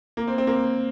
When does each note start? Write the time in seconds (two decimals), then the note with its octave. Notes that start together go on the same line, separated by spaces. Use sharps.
0.17 A#3
0.27 C4
0.38 C4
0.47 A#3